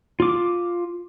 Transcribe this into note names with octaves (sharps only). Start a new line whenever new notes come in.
F4 D6